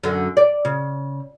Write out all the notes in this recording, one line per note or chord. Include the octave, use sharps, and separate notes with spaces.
F#2 D3
D5
C#3